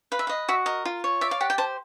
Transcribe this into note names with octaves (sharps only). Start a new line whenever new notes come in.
B4 F5
E5
D#5 F5
F#4 E5
A#4 D#5
F4
C#5
D5 E5
F5
G4 F#5
G5
C5 A5